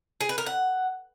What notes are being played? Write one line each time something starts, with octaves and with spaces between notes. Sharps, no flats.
G#4
B4
A#4
F#5